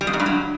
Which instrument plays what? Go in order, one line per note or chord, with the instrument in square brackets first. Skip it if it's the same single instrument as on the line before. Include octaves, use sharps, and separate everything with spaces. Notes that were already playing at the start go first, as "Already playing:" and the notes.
[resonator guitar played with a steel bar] G3
F2
G#2
G2
F#3